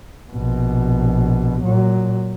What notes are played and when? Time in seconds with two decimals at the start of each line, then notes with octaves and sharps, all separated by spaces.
0.31 A#1 B2
1.64 A#2 F#3